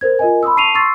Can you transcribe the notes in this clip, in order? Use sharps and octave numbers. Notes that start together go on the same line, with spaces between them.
A#4 C5 G#6
F4 A#4 D#5 G#5
B5 C6 D#6 E6
A5 C#6 C7 D#7 F7
C6 C#6 D#6 E6 A6 C7